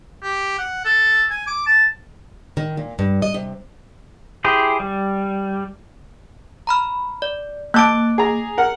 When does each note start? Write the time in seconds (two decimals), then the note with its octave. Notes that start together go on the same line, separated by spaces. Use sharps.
0.23 G4
0.58 F#5
0.85 A4
1.30 G#5
1.47 D6
1.66 A5
2.57 D#3
2.77 A#2
2.99 G2
3.22 D#5
3.34 C3
4.44 E4 G4 G#4 C5
4.80 G3
6.67 A#5 B5 F6
7.22 D5
7.74 A#3 A5 D6 F#6 D7
8.18 G#4 A#5
8.58 A#4 F#5